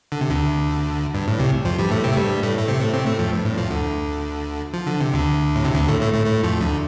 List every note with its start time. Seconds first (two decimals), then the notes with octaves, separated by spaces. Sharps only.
0.12 D3
0.21 C3
0.30 D2 D3
1.14 G2
1.28 A2
1.40 C2 C3
1.65 F2 F3
1.79 G2 G3
1.91 A2 A3
2.04 C3 C4
2.12 A3
2.17 G2 G3
2.43 A2 A3
2.58 A3
2.68 C3 C4
2.80 A2 A3
2.93 C3 C4
3.06 A2 A3
3.19 F2 F3
3.33 G2
3.45 A2
3.57 F2 F3
3.70 D2 D3
4.73 F3
4.86 D3
5.01 C3
5.14 D2 D3
5.55 A2
5.65 C3
5.75 D2 D3
5.88 A2 A3
6.01 A2 A3
6.13 A2 A3
6.26 A2 A3
6.43 F2 F3
6.60 D2 D3